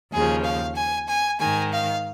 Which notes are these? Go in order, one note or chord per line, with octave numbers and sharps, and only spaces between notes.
D#2 C#3 F3 G#4
F5
G#5
G#5
G#2 D#3 G#5
F5